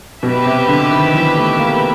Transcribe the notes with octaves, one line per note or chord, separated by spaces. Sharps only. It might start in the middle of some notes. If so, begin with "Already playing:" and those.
B2 G4 B4 E5
C3
D3
D#3
E3
A3
A#3